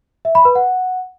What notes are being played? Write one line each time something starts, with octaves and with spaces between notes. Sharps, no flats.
E5
B5
B4
F#5